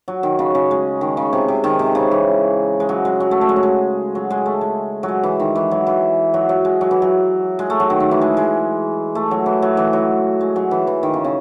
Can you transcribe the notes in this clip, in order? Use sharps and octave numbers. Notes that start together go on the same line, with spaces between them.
F#3
D#3
C#3
C#3
G#3
D#3
C#3
C3
C3
D#3
C3
C#3
E3
G#3
F#3
G#3
F#3
A3
A3
G#3
F#3
G#3
F#3
G#3
A3
G#3
F#3
G#3
E3
D#3
E3
F#3
E3
F#3
F#3
G#3
F#3
E3
F#3
G#3
A3
F#3
D#3
D#3
E3
G#3
G#3
A3
F#3
E3
F#3
E3
F#3
G#3
F#3
E3
E3
D#3
C#3
C#3